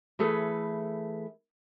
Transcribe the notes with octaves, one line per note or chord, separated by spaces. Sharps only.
E3 A3 G#4 A4 B4